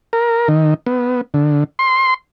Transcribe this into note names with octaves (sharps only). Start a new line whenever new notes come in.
A#4
D#3
B3
D3
C6